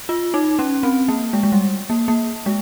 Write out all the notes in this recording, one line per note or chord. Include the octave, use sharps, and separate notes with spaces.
F4
D#4
C#4
C4
A#3
G#3
G#3
G3
A#3
A#3
G#3